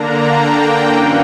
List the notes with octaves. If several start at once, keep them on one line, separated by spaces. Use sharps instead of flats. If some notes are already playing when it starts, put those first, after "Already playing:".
Already playing: D3 A#3 D4 A#5
G5
F#2 E3 A#3 C#4 F#5